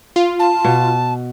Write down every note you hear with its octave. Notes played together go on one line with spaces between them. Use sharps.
F4
A5
B2